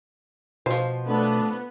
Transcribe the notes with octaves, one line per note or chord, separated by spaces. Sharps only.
B2 F3 C5
A3 B3 D4